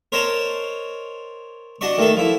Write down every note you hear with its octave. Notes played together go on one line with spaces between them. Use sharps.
A#4 C5 C#5 D#5 A5
D4 F#4 D5 D#5 C#6
D#3 A3 A4
F3 E4